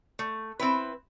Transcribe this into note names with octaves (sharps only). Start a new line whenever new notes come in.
A3
C4 E4 B4